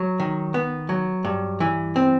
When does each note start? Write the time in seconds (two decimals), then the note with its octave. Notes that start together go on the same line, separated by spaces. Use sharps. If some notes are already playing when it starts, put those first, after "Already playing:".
Already playing: F#3
0.20 D#3
0.54 B3
0.89 F#3
1.25 G2
1.60 E3
1.96 C4